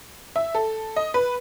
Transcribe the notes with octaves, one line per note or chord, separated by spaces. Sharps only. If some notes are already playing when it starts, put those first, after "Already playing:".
E5
A4
D#5
B4